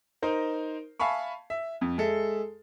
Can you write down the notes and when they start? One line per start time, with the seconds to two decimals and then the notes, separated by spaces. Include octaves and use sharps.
0.22 D#4 A#4 C5
0.99 E5 F5 G#5 A5 B5 C#6
1.50 E5
1.81 F2
1.98 G#3 A4 E5